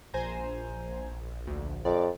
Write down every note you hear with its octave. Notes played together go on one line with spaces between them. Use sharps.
A#1 C5 G#5 A#5
D2
F2 D5